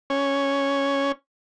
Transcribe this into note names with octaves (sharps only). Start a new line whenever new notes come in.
C#4